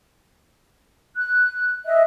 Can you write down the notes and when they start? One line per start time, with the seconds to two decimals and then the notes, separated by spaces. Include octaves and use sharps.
1.16 F#6
1.86 D#5 E5